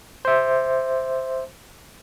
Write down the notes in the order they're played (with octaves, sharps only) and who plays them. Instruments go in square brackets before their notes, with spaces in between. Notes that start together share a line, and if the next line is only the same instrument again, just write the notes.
[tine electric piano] C5 E5